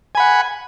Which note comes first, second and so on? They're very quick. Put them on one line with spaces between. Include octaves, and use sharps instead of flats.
G#5 B5 F#5